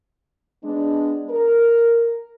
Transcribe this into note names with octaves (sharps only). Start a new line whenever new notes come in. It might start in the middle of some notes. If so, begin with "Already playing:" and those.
G#3 B3 D4
A#4